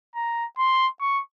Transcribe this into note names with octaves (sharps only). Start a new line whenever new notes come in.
A#5
C6
C#6